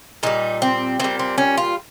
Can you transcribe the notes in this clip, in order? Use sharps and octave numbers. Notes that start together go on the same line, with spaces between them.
A#2 G3 D#4
C4
A#2 G3 C4
C4
C#4
F4